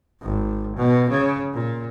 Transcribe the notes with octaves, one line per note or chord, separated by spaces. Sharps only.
G#1
B2
C#3
A#2